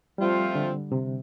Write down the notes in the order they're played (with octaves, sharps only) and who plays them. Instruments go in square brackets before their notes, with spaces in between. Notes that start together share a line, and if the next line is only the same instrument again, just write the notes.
[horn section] F3 A3 C4 F4 [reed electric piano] G3
[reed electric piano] D3
C3